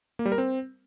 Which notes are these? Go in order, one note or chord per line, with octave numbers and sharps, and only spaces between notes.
A#3
G3
A#4
C4